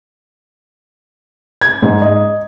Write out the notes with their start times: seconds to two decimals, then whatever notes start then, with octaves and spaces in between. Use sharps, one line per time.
1.61 G#6
1.82 G#2
2.02 D#5